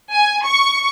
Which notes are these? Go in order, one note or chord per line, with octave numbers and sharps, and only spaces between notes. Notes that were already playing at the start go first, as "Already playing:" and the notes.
G#5
C#6